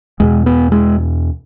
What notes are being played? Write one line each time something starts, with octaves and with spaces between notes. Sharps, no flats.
E2 B2 G#3
B3
G#3